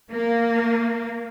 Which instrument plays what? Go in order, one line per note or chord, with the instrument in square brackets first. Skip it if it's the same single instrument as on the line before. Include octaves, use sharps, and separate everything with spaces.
[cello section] A#3